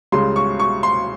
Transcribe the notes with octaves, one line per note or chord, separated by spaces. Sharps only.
C#2 C#3 G3 C6
C#6
C#6
C6